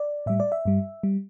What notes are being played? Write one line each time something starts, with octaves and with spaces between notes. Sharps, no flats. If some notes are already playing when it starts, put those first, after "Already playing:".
Already playing: D5
A2 G3 E5
D5
E5
G2 G3
G3